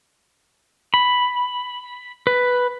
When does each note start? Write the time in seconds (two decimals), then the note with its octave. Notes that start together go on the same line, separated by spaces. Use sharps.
0.94 B5
2.27 B4